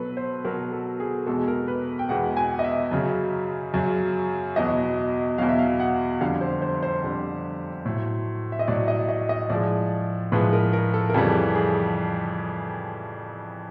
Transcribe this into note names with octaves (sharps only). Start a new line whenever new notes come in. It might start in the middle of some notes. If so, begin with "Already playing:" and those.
Already playing: B2 F#3 A4 B4
C5
B2 F#3 A#4
A4
G#4
E2 B2 G#3 A4
A#4
B4
G5
E2 B2 G#3 F#5
G#5
D#5
E5
F#2 C#3 F#3
F#2 C#3 F#3
E2 B2 F#3 D#5
E2 B2 F#3 F5
E5
F5
F#5
F2 D3 G3 F5
C5
C5
C5
F2 D3 G3
A2 F#3
E5
D#5
A2 F#3 D5
D#5
D#5
D#5
A2 F3 G#3 D5
A2 F3 G#3 B4
A#4
A#4
A4
A#4
F2 C#3 E3 G3 A4
G#4